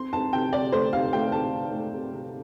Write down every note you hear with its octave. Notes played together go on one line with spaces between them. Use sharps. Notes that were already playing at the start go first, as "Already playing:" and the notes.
Already playing: C4 C6
C4 A5
C3 G5
C3 D5
A3 C5
C3 F5
A3 G5
C3 A5
C4
A3
C3
C3